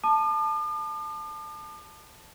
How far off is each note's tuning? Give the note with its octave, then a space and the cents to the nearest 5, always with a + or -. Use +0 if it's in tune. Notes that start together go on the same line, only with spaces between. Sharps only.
A5 +0 D6 +45